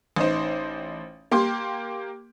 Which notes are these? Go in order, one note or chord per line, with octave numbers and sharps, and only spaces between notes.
A1 D#4 C5
A#3 G4 C6